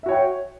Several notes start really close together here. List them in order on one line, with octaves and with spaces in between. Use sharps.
E5 F#4 C#5 G5